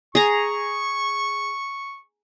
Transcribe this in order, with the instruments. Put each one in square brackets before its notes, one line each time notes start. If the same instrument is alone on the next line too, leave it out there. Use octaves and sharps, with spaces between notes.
[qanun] G#4 A#5 [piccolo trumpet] C#6